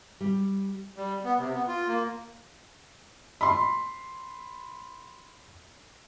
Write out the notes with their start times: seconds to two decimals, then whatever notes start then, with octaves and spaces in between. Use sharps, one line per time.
0.21 G3
0.97 G3
1.25 B3
1.38 C3
1.54 B3
1.68 F4
1.88 A#3
3.41 B5 C6